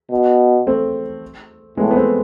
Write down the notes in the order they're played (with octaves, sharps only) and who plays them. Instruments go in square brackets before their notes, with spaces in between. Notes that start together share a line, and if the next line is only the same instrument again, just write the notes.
[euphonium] B2
[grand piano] A3 C4
[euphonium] A2 [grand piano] G#3 B3
[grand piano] B3
A3 C4